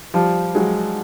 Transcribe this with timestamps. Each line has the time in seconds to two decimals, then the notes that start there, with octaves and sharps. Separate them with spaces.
0.14 F3 G3
0.55 F#3 G#3